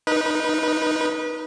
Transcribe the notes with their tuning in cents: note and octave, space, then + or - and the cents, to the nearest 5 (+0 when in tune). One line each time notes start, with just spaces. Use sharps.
D#4 +0 B4 -25